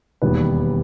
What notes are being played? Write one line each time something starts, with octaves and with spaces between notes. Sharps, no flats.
E1 D#2 D#3 G3 B3 B4